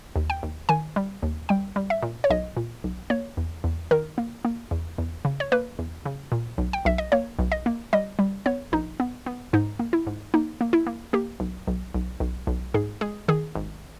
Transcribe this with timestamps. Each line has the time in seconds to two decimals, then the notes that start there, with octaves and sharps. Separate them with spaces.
0.16 D#2
0.30 G5
0.43 D#2
0.69 D#3 G#5
0.96 G3
1.22 D#2
1.49 G3 G5
1.76 G3
1.90 E5
2.03 A#2
2.24 C#5
2.30 B1 D#5
2.57 A#2
2.84 B1
3.10 A#3 C#5
3.37 E2
3.64 E2
3.91 D#3 A#4
4.18 A#3
4.45 A#3
4.71 E2
4.98 E2
5.25 C#3
5.40 C#5
5.52 A#3 B4
5.79 E2
6.05 C#3
6.32 A#2
6.58 B1
6.73 G5
6.85 B1 E5
6.98 D#5
7.12 A#3 C#5
7.39 B1
7.52 D#5
7.66 A#3
7.93 G3 D#5
8.19 G3
8.46 B3 C#5
8.72 A#1 D#4
9.00 B3
9.26 B3
9.53 G#2 D#4
9.79 A#3
9.93 E4
10.07 G#2
10.34 A#3 D#4
10.61 A#3
10.73 E4
10.87 A#3
11.13 A#3 G4
11.40 B1
11.67 B1
11.94 B1
12.20 B1
12.47 B1
12.74 G#2 G#4
13.01 G#3 G#4
13.28 D#3 G#4
13.55 G#1